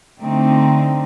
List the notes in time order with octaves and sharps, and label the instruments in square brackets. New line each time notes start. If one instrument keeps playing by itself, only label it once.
[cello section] D3 A3 C4 D#4